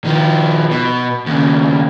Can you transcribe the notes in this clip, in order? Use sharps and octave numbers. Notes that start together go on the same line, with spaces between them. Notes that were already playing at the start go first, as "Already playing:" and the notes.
D#3 F3
B2
D#2 C#3